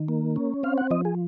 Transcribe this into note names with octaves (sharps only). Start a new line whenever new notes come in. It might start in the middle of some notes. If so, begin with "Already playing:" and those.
Already playing: D#3
A#3
C#4
C4 F5
F#5
F3 D#5
G#4